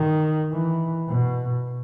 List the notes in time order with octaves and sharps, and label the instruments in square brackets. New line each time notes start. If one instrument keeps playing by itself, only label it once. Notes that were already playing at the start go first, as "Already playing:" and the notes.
Already playing: [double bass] D#3
E3
B2